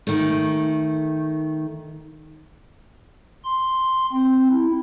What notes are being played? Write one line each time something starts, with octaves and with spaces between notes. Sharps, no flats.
D#3 A3
C6
C4
E4